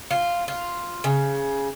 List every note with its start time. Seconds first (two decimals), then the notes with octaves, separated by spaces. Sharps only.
0.11 F4
0.48 F4
1.04 C#3